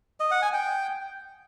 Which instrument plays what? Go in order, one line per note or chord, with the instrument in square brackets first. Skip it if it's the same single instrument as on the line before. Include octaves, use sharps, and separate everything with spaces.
[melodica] D#5
F#5
G#5
G5